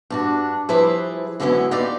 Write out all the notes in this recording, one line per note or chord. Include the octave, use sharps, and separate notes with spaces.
G2 D4 F#4
F3 G3 E4 G#4 B4 C5
F#2 D3 G#3 B3 C#4 E4
D#4 F4 G4 B4 D5